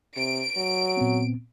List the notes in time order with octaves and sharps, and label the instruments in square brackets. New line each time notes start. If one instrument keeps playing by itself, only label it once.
[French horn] C3 [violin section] D7
[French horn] F#3
[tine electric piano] A#2 B3 C4